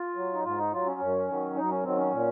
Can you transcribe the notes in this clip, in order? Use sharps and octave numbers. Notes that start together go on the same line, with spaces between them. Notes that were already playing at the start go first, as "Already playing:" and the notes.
Already playing: F4
F#3
D#4
G#2 F4
D#4
F#3 F4
C#4
F#2
D#3 F#3
F#2 D#4
C#4
D#3 F#3 C4
C#4
A#2